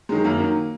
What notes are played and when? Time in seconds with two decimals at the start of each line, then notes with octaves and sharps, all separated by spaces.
0.09 D#3 F#3 G#3
0.24 F#2 A#3
0.39 D#3 F#3